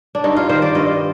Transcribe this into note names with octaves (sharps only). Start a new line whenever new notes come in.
D4
G2 D#4
F4
D#3 C5
D5
G2 D#5